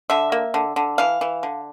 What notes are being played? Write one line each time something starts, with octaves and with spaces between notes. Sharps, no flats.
D3 E5
A#3
D3
D3
E3 F5
E3
D3